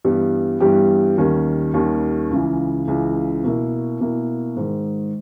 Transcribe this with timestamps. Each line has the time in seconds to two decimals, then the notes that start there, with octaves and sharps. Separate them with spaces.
0.05 G2 E3 G3 B3 G4
0.60 G2 E3 G3 B3 G4
1.18 D#2 D#3 G3 C#4
1.74 D#2 D#3 G3 C#4
2.30 C#2 C#3 E3
2.87 C#2 C#3 E3
3.44 B2 A#3 E4
4.00 B2 A#3 E4
4.56 G#2 D#3 G#3